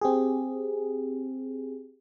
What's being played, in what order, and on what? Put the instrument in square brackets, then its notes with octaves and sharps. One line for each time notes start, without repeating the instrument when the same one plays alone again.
[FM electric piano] C4 G4 G#4